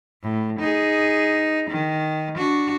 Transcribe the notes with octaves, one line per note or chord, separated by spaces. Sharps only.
A2
D#4 G#4
D#3
D4 F#4